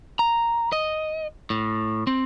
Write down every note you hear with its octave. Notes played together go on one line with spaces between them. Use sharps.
A#5
D#5
A2
C4